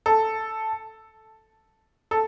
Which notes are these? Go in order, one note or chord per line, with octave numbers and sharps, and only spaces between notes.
A4
A4